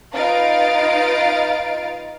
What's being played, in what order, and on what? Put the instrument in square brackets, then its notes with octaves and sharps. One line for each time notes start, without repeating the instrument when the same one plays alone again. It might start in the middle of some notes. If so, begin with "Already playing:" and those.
[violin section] D#4 F4 B4 F5 A6 D7